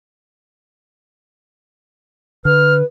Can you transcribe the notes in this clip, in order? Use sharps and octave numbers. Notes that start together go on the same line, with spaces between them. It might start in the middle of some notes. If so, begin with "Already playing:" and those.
D3 B4 F6